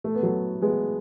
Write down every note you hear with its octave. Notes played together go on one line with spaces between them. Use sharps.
A3
B3
F#3 A3
G#3 B3